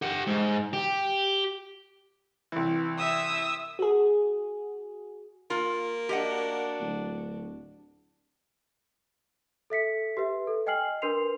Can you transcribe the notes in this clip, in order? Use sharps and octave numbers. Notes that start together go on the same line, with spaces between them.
G4 F#5
G#2
G4
C2 E3
E5 D#6 E6
F#4 G#4
A#3 F4
D4 F#4 G4 D#5 F#5
D1
A4 E5 B6 C#7
G4 B4 E5
A4
D#5 G5 G#5 F6 C7 F#7
D4 A#4 B4 C6 C7 F7